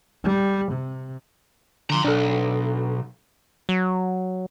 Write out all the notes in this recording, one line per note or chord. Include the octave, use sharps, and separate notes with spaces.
G3
C3
D3 F3 A#5 C6
B1 D4 A4
F#3